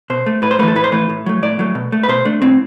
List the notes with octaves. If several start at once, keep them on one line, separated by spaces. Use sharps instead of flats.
B2 C5
A3
A2 B4
C5
E3 A3 A4 B4
A2 B4
C5
E3 A3 B4
A2
F#3 A3
A2 D5
F#3 A3
B2
A3
B4
B2 C5
A3 D4
A2 C4